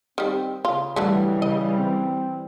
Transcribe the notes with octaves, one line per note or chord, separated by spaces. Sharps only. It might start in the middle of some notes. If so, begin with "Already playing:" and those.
D#3 G3 C4
C#3 F4
D3 E3 F#3 G3 A3
C#3 D#5
C4